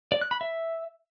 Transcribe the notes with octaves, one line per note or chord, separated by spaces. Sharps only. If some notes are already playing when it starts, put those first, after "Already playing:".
D5
F#6
B5
E5